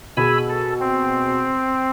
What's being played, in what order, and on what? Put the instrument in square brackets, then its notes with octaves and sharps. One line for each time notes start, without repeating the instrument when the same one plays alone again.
[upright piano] B2 G#4 [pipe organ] G#5 B5 E6
[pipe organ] A4
C4